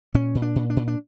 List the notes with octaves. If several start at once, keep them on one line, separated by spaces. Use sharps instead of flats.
A#2 C#4
A#2
D4
A#2
D4
A#2
D4